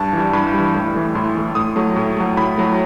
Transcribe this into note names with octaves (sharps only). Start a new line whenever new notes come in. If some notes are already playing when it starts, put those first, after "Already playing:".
Already playing: G2 A5
E3 G3
G2 B5
E3 G3
A2
E3 A3
A2 C6
E3 A3
A2 D#6
F#3 A3
A2
F#3 A3
A2 B5
F#3 A3